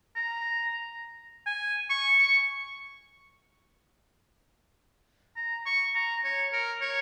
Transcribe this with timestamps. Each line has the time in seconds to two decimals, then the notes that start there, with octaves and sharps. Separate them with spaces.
0.16 A#5
1.46 G#5
1.90 C#6
2.19 C#6
5.36 A#5
5.66 C#6
5.95 A#5
6.24 C#5
6.53 A#4
6.81 C#5